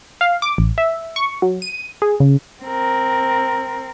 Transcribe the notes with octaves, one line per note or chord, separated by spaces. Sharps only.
F5
D6
A1
E5
C#6
F#3
D#7
G#4
C#3
C4 A#4